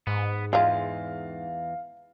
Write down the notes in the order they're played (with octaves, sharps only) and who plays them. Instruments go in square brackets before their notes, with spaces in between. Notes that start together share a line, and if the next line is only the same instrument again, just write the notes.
[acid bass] G#2 [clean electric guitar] B3
[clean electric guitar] E2 [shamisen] G#3 F4 [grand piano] F5